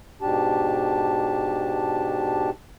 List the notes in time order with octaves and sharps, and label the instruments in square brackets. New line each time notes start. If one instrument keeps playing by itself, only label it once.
[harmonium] G#2 B2 D4 G4 A5